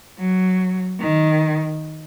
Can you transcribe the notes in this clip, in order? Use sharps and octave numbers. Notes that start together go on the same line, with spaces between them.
F#3
D#3